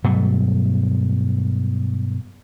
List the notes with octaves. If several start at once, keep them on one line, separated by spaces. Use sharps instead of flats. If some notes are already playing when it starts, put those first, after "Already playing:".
G2 B2 F#3 A3